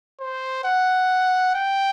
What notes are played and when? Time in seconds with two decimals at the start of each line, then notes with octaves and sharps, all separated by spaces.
0.20 C5
0.64 F#5
1.55 G5